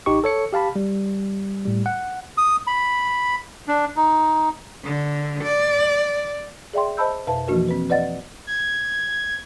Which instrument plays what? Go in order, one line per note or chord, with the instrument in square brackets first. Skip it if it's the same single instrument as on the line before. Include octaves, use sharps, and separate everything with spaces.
[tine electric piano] A1 D#4 G4 C#6
A4 C#5 C#7
G4 F5 A5 B5
G3
A2 G3
F#5
[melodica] D#6
B5
D4
D#4
[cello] D3
D5
[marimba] G#4 D5 E5 G5 C6
C5 D#5 A5 B5 E6 G6
F2 B2 B4 E5 A5
E3 F3 A#3 D4 F#4 A#4
C4 B4
B4 D5 D#5 F#5 A6
[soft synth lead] G#6